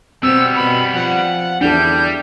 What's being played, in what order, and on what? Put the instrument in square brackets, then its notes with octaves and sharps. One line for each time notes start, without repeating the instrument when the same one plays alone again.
[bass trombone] B2 [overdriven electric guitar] G3 B3 [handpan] C4 [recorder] E6
[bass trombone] B2 [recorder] B5
[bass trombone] F3 [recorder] F#5
[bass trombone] E2 [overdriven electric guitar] G3 [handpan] D4 E4 A4 [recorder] G6